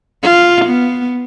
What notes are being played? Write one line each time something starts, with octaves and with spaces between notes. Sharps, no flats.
F4
B3